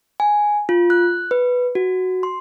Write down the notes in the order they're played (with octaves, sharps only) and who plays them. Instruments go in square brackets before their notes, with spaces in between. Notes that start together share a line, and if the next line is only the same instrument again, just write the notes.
[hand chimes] G#5
F4
F#6
B4
F#4
C6